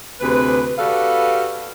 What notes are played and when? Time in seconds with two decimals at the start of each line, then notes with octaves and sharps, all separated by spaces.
0.21 D2 C3 G#4 B4
0.78 F#4 G4 A4 B4 D5 F5